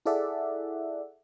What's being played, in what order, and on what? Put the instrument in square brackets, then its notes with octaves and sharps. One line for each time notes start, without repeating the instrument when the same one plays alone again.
[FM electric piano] E4 G#4 A4 D5 E5 F#5